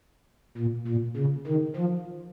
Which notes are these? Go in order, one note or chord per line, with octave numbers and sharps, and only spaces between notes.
A#2
A#2
C#3
D#3
F3